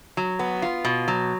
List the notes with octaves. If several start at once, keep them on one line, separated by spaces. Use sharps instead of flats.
F#3
B3
F4
B2
F#3